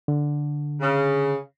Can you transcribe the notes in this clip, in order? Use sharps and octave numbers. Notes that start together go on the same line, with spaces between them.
D3
C#3